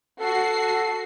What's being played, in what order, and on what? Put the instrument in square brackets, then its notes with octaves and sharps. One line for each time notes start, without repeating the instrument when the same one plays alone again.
[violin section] F#4 C7 [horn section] A4